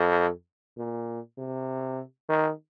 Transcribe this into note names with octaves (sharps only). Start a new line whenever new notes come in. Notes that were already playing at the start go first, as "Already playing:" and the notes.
Already playing: F2
A#2
C3
D#3